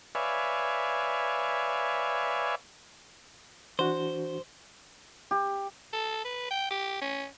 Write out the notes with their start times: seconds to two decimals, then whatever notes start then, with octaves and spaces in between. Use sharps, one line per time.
0.15 B4 C#5 D5 E5 F5 G#5
3.79 E3 D4 F#4 C5
5.31 G4
5.93 A4
6.25 B4
6.51 G5
6.71 G4
7.01 C#4